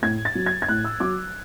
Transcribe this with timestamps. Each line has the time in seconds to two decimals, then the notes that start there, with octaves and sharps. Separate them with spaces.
0.02 A2 G#6
0.25 A6
0.35 F#3
0.46 G#6
0.62 G#6
0.68 A2 F#6
0.85 E6
1.00 F#3 D6